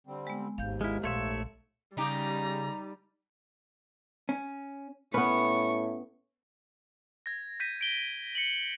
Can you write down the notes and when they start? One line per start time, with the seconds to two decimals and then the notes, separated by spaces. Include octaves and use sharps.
0.07 D3 G3 C4
0.27 G#3 B3
0.58 G#1 D#2 G#2 F5 G6
0.81 G#3 E4 F6
1.03 A#1 A3 C#5 E5 F5 C6
1.97 C#3 G3 D#4 G4 A#5
4.29 C#4
5.14 A2 B3 C#4 B4 C#6
7.26 G#6 A#6
7.60 G6 A#6 B6 D#7
7.81 D7 G7
8.35 C#7 F#7